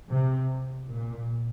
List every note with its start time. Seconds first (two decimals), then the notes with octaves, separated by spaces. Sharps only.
0.11 C3
0.92 A#2